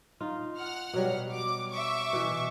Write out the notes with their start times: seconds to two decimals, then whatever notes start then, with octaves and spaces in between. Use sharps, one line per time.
0.20 D#4 F4
0.56 F#5 F6
0.93 B2 F#3 G3
1.32 D6
1.71 E5 C#6 D6
2.13 B2 E3